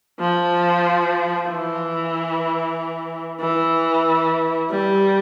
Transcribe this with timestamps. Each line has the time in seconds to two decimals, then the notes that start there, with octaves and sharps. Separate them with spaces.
0.20 F3
1.49 E3
3.41 E3
4.70 G3